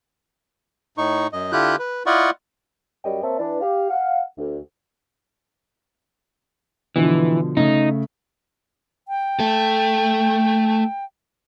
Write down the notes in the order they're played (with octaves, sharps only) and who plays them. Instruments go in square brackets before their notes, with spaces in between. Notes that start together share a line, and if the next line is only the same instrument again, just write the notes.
[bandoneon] A2 D#4 C#6
F#2 D#5
D3 E4 F4 G4 F#6 G6
B4
E4 F4 D5 D#5 F#5 C#6
[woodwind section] F#2 G3 C#5 D#5 G5
A#3 C4 C#5 E5 A5
E3 D4
G4 F5
F5 F#5
D2
[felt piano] B2 D3 F3 [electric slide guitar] E3
[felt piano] C#3 A3 [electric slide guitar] D#4
[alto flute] G5
[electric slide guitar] A3 A4